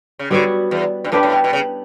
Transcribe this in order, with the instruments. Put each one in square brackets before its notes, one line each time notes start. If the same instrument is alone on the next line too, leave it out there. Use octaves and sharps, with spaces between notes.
[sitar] C#3
[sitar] D3 [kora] G3 B3 F#4 C#5
[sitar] E2
G2
[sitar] A2 [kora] B3 D4 G4 B4
[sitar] A2
B2
B2
C#3